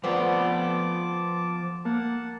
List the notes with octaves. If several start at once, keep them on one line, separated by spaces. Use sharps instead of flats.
D2 F3 B3 C4 D5 A5 D6
A#3 F#5 A5